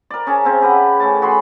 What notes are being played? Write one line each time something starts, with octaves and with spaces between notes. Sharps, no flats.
A#4 D5
C#4 G#4 A5 A#5
C#3 C4 F5
G4 B4 F#5
A2 C#4 A5
F#4 G#4 B5 C6